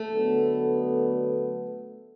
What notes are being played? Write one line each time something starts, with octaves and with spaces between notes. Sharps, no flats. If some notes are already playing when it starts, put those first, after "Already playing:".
Already playing: A3
D3 F#3 B3